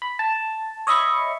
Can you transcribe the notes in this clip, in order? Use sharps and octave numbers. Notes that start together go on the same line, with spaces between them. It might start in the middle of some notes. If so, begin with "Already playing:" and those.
B5
A5
C#5 D#5 E5 B5 C#6